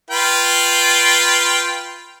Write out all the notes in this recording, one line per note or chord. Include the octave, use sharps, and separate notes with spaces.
F4 B4 G5